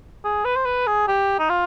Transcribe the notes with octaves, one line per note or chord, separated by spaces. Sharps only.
G#4
B4
C5
B4
G#4
G4
D#4
F4